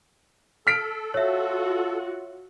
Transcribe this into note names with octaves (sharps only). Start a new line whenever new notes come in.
A4 F6 B6 D7
F4 F#4 C#5 E5 F#5